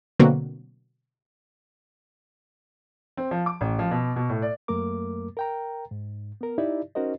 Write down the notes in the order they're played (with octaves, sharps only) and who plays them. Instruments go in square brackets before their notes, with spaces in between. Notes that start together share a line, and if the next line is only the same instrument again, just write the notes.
[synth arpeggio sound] B2 D3 F#3 A#3 C4 F#4
[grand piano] C4
F3
D6
A1
F3
B2
B2
A2
D5
[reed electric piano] F#2 F#3 A3 A#3 A#4 D6
A#4 G5 A#5
G#2
B3 A#4
D#4 E4 G4 D5 E5
C#4 D#4 F#4 A#4 C5 D#5